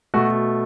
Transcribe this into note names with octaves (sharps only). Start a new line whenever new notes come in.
B2 A3 F#4